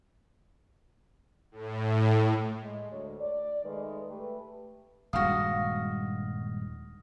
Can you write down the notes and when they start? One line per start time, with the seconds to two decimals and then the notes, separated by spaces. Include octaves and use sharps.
1.51 A2
2.62 G#3
2.91 D2 C#5
3.20 D5
3.64 D#3 G#3 A3 B4
4.08 A3 G4 B4
5.13 D#1 G2 G#3 F#4 F5 D#6 F6 A#6